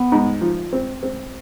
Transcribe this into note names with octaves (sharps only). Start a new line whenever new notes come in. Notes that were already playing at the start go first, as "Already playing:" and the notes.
Already playing: B3
G#2
F3
C4
C4